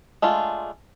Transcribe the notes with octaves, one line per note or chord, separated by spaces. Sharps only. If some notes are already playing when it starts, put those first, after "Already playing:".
G#3 A3 D4 F4